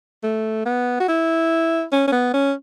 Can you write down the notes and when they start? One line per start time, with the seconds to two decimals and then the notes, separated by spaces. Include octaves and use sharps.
0.23 A3
0.66 B3
1.00 F#4
1.08 E4
1.92 C#4
2.07 C#4
2.12 B3
2.34 C#4